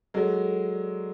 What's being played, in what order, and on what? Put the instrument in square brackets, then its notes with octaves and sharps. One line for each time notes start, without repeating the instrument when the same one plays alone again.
[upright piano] F#3 G#3 [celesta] A4
[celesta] A4
D5